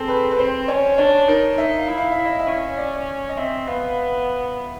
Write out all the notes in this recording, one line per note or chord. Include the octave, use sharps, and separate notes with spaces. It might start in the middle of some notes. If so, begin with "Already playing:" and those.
Already playing: C4 G#4 A4
B4
B4
C4 C5
C#4 C#5
D4 C#5
D#4 A#4
D#4 E5
F5
E4
F5
E5
E4
D#5
E5
C#4
D5
D#5
C4 E5
B3 F5